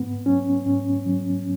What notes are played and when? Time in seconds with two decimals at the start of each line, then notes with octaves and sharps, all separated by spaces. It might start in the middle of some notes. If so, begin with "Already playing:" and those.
Already playing: G#2 B3
0.26 F#3 C#4
0.66 G#2 C#4
1.06 F#3